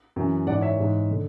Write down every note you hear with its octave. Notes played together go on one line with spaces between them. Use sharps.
F#2 E3
G#2 E3 D5 F#5
C#5 E5
G#2 E3
D3